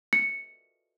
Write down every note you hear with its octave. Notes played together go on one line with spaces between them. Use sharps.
C#7